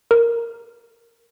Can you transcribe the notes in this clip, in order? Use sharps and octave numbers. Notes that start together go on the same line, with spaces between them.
A#4